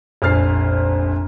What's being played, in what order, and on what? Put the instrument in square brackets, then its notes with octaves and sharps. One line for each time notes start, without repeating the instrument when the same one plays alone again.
[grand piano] F1 A#1 G#5 F6 A6 C7